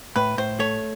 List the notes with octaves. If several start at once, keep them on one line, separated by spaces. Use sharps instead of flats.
A2 B4
A2 C5
A3 C#5